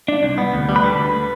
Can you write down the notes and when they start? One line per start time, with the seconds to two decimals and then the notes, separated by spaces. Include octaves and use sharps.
0.08 D4
0.23 C2
0.38 B3
0.53 D2
0.69 G3
0.76 B4 B5
0.84 D3
0.98 D2